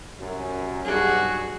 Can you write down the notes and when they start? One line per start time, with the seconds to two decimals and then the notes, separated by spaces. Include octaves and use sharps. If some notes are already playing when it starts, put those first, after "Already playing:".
0.19 C2 F#2
0.85 B1 G2 F#4 G#4